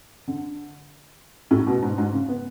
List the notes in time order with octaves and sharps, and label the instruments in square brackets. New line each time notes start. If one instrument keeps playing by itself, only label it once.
[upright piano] D3
A2
B2
G#2
G#2
C#3
B3